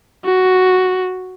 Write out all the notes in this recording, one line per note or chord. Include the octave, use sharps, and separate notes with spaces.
F#4